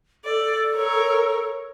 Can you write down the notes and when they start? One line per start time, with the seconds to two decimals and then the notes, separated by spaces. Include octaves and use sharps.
0.25 A4 D5
0.75 A#4 C#5